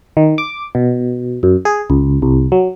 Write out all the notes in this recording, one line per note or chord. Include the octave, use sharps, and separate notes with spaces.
D#3
D6
B2
F#2
G#4
C#2
C2
F#3